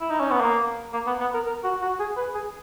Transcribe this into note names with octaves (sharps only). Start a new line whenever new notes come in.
E4
D#4
C#4
B3
A#3
A#3
B3
B3
A#4
A#4
F#4
F#4
G#4
B4
G#4